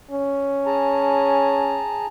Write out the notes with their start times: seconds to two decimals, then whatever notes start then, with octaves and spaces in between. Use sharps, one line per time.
0.11 C#4
0.66 G#4 A5 A#5